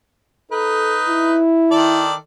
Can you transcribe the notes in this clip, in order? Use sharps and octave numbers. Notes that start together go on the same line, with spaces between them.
D#4 A4 B4
E4
D#3 A4 D5